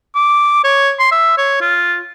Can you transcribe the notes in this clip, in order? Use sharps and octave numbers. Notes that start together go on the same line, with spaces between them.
D6
C#5
C6
E5
C#5
F4